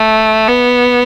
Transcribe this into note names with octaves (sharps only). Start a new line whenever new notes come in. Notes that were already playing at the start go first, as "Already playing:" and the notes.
Already playing: A3
B3